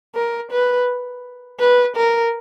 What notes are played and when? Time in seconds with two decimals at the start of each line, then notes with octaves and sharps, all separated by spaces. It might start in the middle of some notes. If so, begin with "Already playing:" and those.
0.15 A#4
0.52 B4
1.60 B4
1.96 A#4